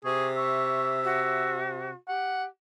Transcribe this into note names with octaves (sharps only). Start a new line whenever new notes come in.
C3 G#4 C#6
E5 C#6
F#4
G4 F#5